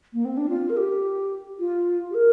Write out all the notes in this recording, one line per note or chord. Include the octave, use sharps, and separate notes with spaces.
A#3
C4
D4
F4
A#4
G4
F4
G4
A#4